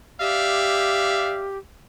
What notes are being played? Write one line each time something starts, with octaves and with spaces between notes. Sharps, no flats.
G4 D5 E5 F5